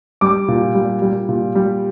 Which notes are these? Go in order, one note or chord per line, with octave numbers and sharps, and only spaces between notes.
G3 D6
A#2
G3
G3
A#2
G3